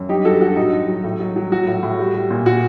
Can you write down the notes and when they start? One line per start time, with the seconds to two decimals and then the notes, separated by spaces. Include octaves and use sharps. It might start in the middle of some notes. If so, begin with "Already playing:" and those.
Already playing: F#2
0.09 G2 D#4 G4
0.25 F#3 F#4 A4
0.41 G2 F#4
0.57 A2 D#4
0.73 F#3
0.88 F#3
1.04 A2
1.20 F#3
1.36 F#3
1.52 F#3 F#4
1.67 A2
1.83 A2
1.99 G3
2.14 G3
2.30 A#2
2.46 A#2 F#4